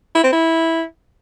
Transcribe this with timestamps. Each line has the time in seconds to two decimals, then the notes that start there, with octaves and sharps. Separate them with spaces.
0.15 E4
0.24 C4
0.32 E4